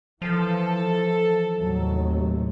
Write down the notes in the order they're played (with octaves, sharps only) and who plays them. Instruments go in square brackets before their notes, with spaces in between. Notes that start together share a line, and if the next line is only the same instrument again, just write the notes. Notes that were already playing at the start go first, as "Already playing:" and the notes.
[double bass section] E3 [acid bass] F3 [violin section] A4
[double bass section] D#2 A2 C3 [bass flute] F#3